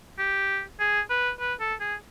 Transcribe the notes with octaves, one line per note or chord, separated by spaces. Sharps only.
G4
G#4
B4
B4
A4
G#4